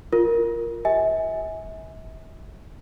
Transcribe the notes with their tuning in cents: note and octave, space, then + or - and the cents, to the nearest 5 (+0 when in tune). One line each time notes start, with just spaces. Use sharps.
F4 +0 A#4 +0
G4 +0 E5 -40 G#5 +0